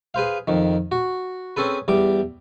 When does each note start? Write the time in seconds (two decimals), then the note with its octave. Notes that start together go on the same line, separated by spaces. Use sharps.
0.14 G#4 B4 C5 F5
0.48 F2 D#3
0.92 F#4
1.57 C4 C#4 G#4 A4 B4
1.88 E2 G3 D6